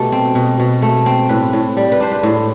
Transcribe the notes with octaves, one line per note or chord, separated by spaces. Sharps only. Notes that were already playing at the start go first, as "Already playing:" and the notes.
Already playing: B2 A3 G4 A4
C4
B2
B2
A3
C4
A2 B4
A2
G3
B4
D4 C5
B4
A2 C5